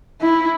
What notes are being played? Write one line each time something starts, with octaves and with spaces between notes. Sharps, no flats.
E4